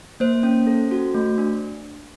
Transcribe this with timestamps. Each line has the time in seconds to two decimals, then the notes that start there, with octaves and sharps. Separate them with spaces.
0.20 A#3 C5
0.43 C#4
0.67 A4
0.91 F#4
1.14 A3
1.38 D4